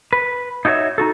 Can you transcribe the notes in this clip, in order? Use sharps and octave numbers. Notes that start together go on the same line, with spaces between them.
B4
D#4 E4 F#4 A4 C#5 E5
D#4 F#4 A4